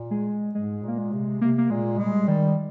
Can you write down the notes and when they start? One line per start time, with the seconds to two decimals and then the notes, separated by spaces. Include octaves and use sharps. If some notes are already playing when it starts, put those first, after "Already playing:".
Already playing: A#2
0.11 G#3
0.55 G#2 G#3
0.83 A#2
0.88 A#3
0.98 G#3
1.13 C3
1.41 C3 A#3
1.58 A#3
1.70 A#2 G#3
1.98 G3 G#3
2.28 D#3 G3